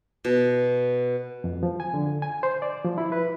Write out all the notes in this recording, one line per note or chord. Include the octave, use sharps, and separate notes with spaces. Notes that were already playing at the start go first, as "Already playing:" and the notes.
B2
F2
F3
G#5
D3
G#5
C5
D5
F3
E4
B4